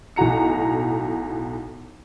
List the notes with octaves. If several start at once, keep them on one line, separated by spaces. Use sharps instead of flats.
B1 A2 F#4 A#5 C#7